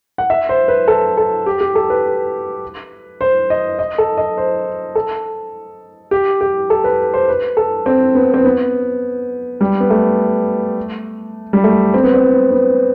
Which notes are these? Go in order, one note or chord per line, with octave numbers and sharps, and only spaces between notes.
F#5
E5
C5
B4
A4
A4
G4
G4
A4
B4
C5
D#5
D#5
A4
D#5
C5
A4
G4
G4
A4
B4
C5
B4
A4
C4
B3
C4
B3
G3
B3
A3
G3
A3
C4
B3
C4
B3